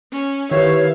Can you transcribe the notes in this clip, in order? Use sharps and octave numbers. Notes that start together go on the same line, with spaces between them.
C#4
D#3 E4 G4 A#4 B4 C#5 E5 F5